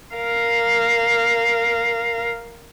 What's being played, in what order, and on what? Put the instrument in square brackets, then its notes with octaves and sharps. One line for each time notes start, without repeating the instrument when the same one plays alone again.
[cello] A#4 F5